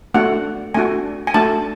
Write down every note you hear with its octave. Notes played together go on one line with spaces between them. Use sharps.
A3 D4 F#4 F#5
A3 D4 F#4 G#5
G#5
A3 D4 F#4 A5